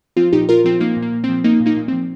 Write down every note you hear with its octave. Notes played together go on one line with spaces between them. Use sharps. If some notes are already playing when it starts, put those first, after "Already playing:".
F3 C4 F4
A#2 D#4 G4
A#2 F4 A#4
F3 C4 F4
F3 A#3 D#4
A#2
A#3
A#2
C4
F3
F3 A#3 D#4
A#2
A#3 D#4
A#2
F3 C4